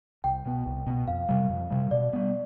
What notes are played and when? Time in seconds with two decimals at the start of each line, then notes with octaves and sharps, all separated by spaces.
0.24 C2 G5
0.46 B2 B3
0.66 C2
0.87 B2 B3
1.08 F2 F5
1.29 C3 G3
1.49 F2
1.70 C3 G3
1.91 B2 D5
2.13 G3 B3